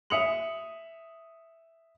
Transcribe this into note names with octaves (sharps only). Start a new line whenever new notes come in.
E5 D#6 C#7 F7 F#7